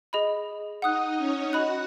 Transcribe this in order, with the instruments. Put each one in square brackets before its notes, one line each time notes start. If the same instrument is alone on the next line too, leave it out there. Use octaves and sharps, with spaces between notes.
[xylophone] G#4 D#5 B5
[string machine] D#4 D#5 [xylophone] F#5 D#6 F#6
[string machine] C#4 C#5
[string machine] F#4 F#5 [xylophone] D#5 B5 F#6